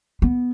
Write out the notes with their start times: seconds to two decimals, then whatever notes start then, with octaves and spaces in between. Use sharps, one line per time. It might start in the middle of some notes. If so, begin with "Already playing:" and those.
0.22 B3